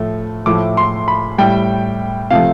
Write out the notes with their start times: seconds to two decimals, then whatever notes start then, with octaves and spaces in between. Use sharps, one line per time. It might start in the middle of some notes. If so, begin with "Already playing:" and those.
Already playing: A2 F3 A3
0.46 A2 F3 A3 D6
0.77 C6
1.08 B5
1.38 A2 G3 G5
2.31 C3 F3 A3 F5